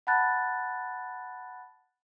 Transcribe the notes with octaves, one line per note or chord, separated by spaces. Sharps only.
F#5 A5 B5 F#6 A6